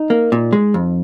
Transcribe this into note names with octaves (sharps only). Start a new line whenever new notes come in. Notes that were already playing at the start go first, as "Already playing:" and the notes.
Already playing: D#4
A#3
A#2
G#3
F2